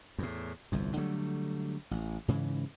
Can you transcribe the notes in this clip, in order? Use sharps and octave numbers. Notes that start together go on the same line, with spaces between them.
E2 A2
G1 C2 F2
D3 F#3 G3 A3
A1
G#2 C#3 E3